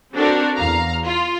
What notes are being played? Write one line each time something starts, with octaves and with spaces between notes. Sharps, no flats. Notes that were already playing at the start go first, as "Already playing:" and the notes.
C4 D4 F#4 A4 A#4 D5
E2 F5 A#5
F4